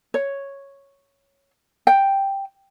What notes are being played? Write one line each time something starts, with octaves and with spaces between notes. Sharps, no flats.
C#5
G5